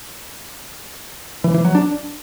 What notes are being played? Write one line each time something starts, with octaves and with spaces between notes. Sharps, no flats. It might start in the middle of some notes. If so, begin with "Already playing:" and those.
E3
E3
F#3
D4